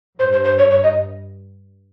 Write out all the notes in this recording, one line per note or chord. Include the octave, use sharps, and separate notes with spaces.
G2 C5
C5
C5
C#5
C#5
D#5